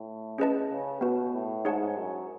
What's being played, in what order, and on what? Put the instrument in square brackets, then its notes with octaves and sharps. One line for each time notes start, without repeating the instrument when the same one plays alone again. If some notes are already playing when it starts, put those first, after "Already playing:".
Already playing: [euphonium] A2
[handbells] C#4 G#4 B4 D#5 A5
[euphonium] C#3
[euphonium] B2 [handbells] B3 F#4 B4
[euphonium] A2
[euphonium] G#2 [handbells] D#4 G#4 C#5 F#5 A5
[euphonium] F#2